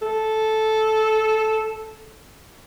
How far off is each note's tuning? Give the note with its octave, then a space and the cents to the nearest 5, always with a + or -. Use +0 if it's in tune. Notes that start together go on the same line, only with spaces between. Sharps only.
A4 -10